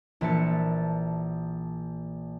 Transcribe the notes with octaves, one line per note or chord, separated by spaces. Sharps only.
A#1 E3 E5 A5 C#7